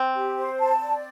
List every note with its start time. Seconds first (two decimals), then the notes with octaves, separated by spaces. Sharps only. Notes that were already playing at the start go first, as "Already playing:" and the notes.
Already playing: C4
0.14 G4
0.37 C5
0.59 A5
0.82 D5